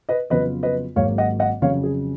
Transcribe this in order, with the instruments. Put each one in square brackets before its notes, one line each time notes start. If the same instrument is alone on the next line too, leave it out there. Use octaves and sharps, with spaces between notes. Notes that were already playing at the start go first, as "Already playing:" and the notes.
[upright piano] B4 D#5
[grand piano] F2 C#3 F#3 B3 F4 [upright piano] B4 D#5
[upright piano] B4 D#5
[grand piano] G#1 G#2 F#3 A#3 [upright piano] C#5 F5
[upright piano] D#5 F#5
D#5 F#5
[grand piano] F2 C#3 F#3 C#4 [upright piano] C#5 F5
[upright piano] G#4